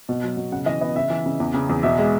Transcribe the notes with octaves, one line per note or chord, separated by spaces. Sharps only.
B2
F#3
B2
C#3 F#5
E3 D#5
B3 D#5
C#3 E5
E3
C#3
E2
C#3
E2
B2 E5
G#3